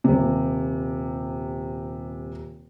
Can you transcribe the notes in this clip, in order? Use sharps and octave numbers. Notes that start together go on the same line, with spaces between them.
D#1 C3